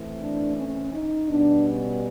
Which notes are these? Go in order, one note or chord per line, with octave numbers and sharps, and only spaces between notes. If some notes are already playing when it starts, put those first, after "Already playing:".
Already playing: A2 E3 A3 C4
D4
C#4
D#4
B2 G3 B3 D4
C#4